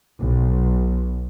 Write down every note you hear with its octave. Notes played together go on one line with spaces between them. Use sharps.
B1